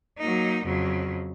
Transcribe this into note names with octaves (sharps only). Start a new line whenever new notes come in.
F#3 A#3 D#4
F2 C#3 F#3